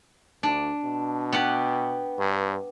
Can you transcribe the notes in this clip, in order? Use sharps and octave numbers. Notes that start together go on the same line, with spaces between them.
D2 D4
B2
B3 G4 F#5
G2